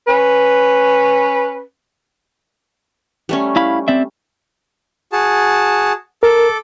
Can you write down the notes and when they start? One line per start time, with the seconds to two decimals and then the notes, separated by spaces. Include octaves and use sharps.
0.07 C#4 B4
3.29 G3 A3 C#4
3.56 E4 F5 B5
3.88 C4 D5 E5
5.12 F#4 G#4 A5
6.23 A4 A#4 D6